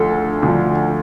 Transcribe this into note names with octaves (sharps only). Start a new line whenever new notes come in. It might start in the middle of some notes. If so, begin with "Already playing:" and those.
Already playing: D2 D3 F3 A4
D2 D3 F3